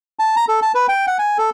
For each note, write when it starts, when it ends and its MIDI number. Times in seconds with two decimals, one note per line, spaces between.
0.19 0.35 81
0.36 0.45 82
0.48 0.60 69
0.62 0.72 81
0.75 0.87 71
0.89 1.06 79
1.07 1.18 78
1.19 1.38 80
1.38 1.50 69